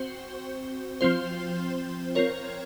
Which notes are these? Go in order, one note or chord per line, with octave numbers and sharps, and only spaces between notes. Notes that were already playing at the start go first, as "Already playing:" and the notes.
Already playing: C4 F#4 C5
F3 C4 F4 C5
C4 F4 A#4 C#5